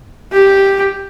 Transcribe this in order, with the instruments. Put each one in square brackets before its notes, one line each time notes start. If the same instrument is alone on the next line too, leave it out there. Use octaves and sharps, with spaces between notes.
[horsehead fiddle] G4